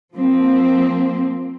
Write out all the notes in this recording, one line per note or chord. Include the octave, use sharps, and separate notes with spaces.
F3 A#3 C4